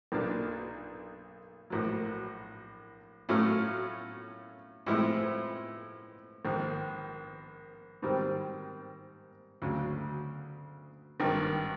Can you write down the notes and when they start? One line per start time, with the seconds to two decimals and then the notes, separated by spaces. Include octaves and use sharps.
0.12 B1 A#2 F#3 A#3 D4
1.70 A#1 A2 F#3
3.29 A2 F#3 A3 C#4 F4
4.86 A2 F3 G#3 C4 E4
6.45 A#1 G#2 D#3
8.02 G#2 D#3 G3 C4
9.62 D2 C#3 F#3
11.20 G#1 G2 D#3